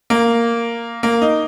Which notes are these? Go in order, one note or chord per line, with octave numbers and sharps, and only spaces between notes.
A#3
A#3
D#4